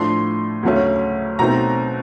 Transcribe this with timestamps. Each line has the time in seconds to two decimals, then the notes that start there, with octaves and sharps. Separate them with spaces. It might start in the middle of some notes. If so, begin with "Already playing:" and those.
Already playing: A2 F3 A3 D4 C6
0.63 D2 C#3 F#3 A3 C#4
1.39 B2 F#3 A3 C4 D#4 A#5